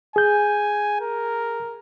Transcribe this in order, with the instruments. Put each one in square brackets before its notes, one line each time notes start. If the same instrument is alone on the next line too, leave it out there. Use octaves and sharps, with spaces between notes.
[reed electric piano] G#4 G6 [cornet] G#5
[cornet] A#4